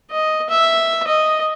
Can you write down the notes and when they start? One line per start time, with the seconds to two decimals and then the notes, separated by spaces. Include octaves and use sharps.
0.11 D#5
0.49 E5
1.08 D#5